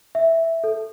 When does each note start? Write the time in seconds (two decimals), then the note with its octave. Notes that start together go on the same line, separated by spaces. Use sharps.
0.15 E5
0.64 A4